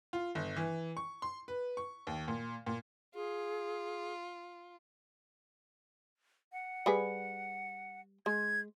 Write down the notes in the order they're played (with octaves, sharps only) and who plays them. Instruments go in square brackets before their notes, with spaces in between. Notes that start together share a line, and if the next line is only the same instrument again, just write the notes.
[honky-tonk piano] F4
G1
E3
C#6
C6
B4
C#6
D#2
A#2
A#2
[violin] F4 [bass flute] G#4
[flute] F#5
[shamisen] G3 G#4 B4
[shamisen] G#3 [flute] G#6